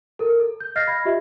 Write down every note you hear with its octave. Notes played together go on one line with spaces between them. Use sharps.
A4 A#4
A4
G6
D#5 F5 F6 A6 A#6 C7
B5 G#6 A#6
F4 G4 D#5 E5